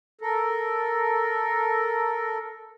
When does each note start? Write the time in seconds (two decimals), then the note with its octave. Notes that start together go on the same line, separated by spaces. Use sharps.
0.21 A4 A#4